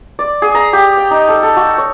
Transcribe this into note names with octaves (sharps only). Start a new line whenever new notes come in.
D5
G#4
A#5
G4
G5
D#4
A4
A4
F#4
C#5